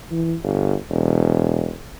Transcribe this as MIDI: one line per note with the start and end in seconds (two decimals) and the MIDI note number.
0.11 0.34 52
0.43 0.74 31
0.90 1.73 28